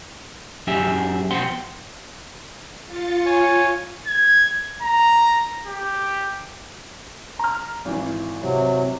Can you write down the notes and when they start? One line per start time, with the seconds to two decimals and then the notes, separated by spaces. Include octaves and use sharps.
0.67 F#2 G4 G#4 E5
1.31 F2 B2 C5 F#5 G5 C6
2.86 F4 A6 C#7
3.26 C#5 G#5
4.07 G#6
4.82 A#5
5.67 G4
7.39 A#5 F6
7.85 G#1 E3
8.42 C3 F#3